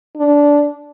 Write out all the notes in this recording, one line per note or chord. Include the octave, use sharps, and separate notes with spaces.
D4